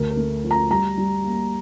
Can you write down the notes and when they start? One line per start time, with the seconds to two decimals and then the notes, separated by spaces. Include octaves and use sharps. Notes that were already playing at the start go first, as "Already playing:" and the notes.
Already playing: D2 A#4
0.11 A#4
0.17 A3
0.44 F3
0.51 A#5
0.70 G3 A#5
0.97 G3
1.24 A#3